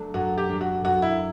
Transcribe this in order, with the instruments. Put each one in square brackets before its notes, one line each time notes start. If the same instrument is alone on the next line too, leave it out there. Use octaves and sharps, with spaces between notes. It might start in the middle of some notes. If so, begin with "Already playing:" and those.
Already playing: [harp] F#3 A3 D4
[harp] F#2 [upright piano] F#4
[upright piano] G4
[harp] F#3 A3 D4
[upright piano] F#4
[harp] F#2 [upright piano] F#4
[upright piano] E4